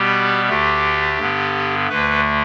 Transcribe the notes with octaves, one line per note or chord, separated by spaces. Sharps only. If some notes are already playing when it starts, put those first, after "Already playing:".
Already playing: B2 G3 B3 G4
D2 D3 A3 G4
G2 D3 B3
D2 D3 A3 B4